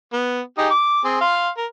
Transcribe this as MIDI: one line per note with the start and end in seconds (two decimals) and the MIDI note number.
0.13 0.42 59
0.58 0.70 63
0.58 0.70 67
0.58 0.70 68
0.70 1.02 86
1.04 1.20 60
1.04 1.20 68
1.21 1.49 77
1.21 1.49 84
1.57 1.66 70